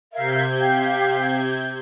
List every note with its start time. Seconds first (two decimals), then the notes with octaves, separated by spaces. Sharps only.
0.13 C3 A#4 E5 F5 G6 G#6
0.58 G4 F5